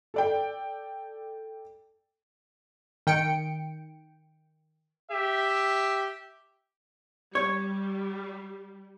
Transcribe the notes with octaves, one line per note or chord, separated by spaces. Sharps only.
A4 D5 G5
D#3 G5 C#7 D7
G4 E5
G3 C#5